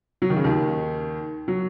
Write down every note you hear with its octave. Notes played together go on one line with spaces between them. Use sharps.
F#3
D#3
C#3
D#2 D#3
F#3